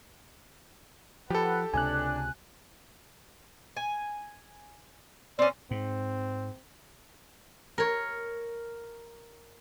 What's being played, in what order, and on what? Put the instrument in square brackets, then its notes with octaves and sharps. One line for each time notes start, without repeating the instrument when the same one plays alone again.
[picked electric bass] F3 [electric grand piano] G4 A4 [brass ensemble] B4 F#5
[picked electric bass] C#2 C3 [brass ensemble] D4 [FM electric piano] G#5 F#6
[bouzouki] G#5
[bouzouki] C4 C#4 [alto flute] D5
[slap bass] G#2 [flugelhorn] C4
[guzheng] A#4 C#5